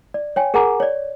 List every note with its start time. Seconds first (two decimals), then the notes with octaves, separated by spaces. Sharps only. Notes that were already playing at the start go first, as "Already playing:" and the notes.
0.14 D5
0.36 C#5 G5 G#5
0.54 G#4 A#4 F#5 G#5 A#5 D6
0.80 C#5 D5